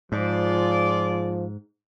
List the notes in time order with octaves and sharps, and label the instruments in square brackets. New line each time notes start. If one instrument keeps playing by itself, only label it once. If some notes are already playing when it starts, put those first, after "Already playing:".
[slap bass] G#2 [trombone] F3 [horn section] F4 G#4 D5